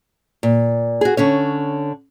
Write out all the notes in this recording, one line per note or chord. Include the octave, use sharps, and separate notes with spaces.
A#2
F#4 G#4
D3 C#4 C#5